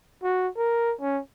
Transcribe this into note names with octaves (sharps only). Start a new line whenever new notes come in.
F#4
A#4
C#4